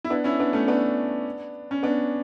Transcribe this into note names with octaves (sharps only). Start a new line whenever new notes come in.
E4
B3 D4
C#4 E4
B3 D4
A3 C#4
B3 D4
C#4
B3 D4